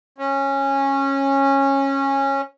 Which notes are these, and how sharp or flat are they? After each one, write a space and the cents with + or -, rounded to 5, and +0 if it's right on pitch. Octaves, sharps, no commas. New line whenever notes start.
C#4 -15